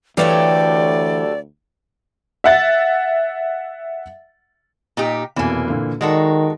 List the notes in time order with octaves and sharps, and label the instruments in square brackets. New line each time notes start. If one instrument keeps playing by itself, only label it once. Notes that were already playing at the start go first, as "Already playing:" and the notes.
[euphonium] D2 [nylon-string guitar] E3 F5 [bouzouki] F#3 A3 G4 [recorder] D5
[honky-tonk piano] E5 F#5 A6
[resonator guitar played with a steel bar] A#2 D#4 G4
[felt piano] F1 B2 G#5 [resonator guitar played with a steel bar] E3 A#3
[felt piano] A#2 D3
[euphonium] D#3 [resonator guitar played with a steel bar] G#3 F#4 A4 [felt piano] D5